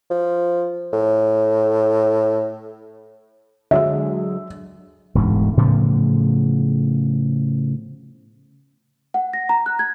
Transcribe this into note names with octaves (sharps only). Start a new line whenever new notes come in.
F3
A2
D3 F#3 G#3 E5
E1 D2 G#2
A2 C#3 F3 B3
F#5
A#6
A#5
F#6
G#6